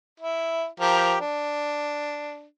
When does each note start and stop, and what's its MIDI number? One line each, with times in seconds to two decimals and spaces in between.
0.20 0.66 64
0.80 1.16 53
0.80 1.16 67
0.80 1.16 70
1.20 2.44 62